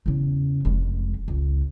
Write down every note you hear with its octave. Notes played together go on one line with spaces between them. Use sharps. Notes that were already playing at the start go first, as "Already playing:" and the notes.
E2 C#3
F1 G#3
C#2